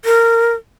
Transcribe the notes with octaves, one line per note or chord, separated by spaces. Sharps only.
A#4